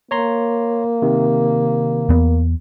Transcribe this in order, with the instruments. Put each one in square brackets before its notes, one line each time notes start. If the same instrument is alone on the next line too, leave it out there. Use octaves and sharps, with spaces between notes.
[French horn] A#3 [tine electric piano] C#5 A#5 C6
[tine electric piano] C3 D#3
[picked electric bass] E2 B3